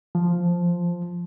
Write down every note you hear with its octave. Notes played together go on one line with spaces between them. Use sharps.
F3